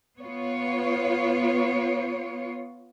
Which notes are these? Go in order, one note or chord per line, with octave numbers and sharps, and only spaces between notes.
B3 F4 C#5